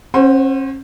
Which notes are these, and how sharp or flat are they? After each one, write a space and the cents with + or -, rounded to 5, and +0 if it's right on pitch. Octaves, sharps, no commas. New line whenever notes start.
C#4 -40 C5 +0 F#5 +5